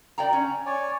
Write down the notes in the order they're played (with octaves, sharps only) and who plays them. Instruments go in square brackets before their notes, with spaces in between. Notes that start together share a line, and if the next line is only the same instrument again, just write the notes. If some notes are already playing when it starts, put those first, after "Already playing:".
[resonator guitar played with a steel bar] D5 G5 A#5
C#4
[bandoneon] C#5 D5 G#5